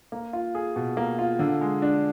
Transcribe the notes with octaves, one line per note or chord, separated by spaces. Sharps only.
A#3
F4
G#4
B2
A#3
F4
D3
G#3
D4